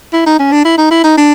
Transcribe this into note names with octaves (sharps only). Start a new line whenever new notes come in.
E4
D#4
C#4
D4
E4
D#4
E4
D#4
D4